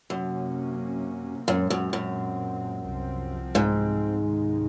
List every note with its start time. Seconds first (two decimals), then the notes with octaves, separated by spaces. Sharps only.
0.10 F#2 C3 F#3 A#3 C#4
1.48 F#2 A#2 G#3 C4
1.70 F#2
1.93 F#2
2.85 C2 C3 F3 C4
3.55 G#2
4.23 C#2 C3 D#3 G#3